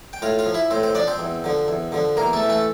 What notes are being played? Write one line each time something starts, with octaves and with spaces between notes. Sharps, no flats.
G5
A2 F4 F5
F4 F5
F3
E4 E5
A2 C4 C5
C4 C5
F3 D4 D5
C4 C5
E2
D3 F3
E2
D3 F3
E2 A#3 A#4
A3 A4
E3
A3 A4